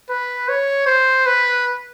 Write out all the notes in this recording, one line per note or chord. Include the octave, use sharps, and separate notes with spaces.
B4
C#5
C5
B4